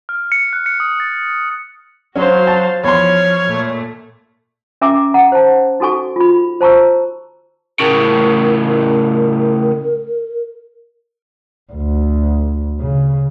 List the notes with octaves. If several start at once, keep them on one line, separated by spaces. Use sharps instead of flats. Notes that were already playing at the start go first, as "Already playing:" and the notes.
F6
C#7
F#6
C#7
D#6
A6
F#3 C#4 F#4 C5 F5
A5
E2 F3 C#5 C6 F6
A#2 A3
C#4 A#4 E5 G#5 A#5 D6
F#5 A#5
C5 A5
D#4 F#4 A4 G#5 C#6
F4 B5
C5 A5 A#5 C#6 E6
A2 C#3 A#4
D2
C#3